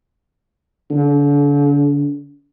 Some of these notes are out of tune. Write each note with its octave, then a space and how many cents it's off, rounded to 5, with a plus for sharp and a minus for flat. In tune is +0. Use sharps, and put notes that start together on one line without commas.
D3 -40